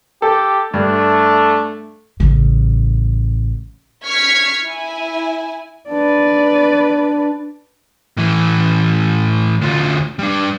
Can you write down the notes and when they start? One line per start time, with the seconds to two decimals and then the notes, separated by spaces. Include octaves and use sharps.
0.22 G4 A4
0.74 G2 A3 D4
2.20 A1 C#3
4.05 C#6 F6 G#6 B6
4.65 E4 G#5
5.90 D4 B4 D5
8.17 A2 E3
9.61 D2 F4
10.19 G3 D4